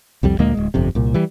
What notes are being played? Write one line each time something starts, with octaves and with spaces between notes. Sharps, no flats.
C2 F2 G3
D2 A#2 G#3 A#3
D1 G#3
G1 F2 C3
C2 A#2
E3 G3